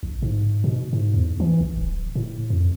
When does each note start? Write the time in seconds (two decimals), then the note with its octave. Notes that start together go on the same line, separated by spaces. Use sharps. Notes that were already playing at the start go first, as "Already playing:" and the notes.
0.03 A#1
0.22 G#2
0.64 B2
0.93 G#2
1.14 E2
1.40 E3
1.61 A#1
1.78 D1
2.15 A2
2.50 F2